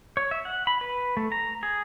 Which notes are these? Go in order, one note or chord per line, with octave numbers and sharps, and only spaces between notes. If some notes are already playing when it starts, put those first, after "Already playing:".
C#5
E5
F#5
B5
B4
A3
A#5
G#4